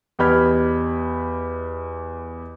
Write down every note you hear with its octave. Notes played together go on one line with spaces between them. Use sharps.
E2 G4 D#5 B5 F6 G#6